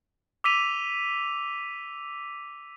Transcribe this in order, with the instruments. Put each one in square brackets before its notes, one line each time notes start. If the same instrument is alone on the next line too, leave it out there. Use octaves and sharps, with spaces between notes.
[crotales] D6 E6 B6 D#7 F7